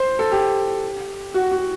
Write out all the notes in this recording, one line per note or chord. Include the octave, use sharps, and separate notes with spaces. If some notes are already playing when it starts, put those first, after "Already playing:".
Already playing: C5
A4
G4
F#4
F#4